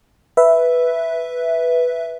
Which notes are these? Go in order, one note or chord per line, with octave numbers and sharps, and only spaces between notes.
B4 E5